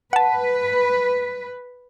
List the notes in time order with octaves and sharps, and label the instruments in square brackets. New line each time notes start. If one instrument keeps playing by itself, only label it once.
[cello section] B4 [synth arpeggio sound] F#5 A5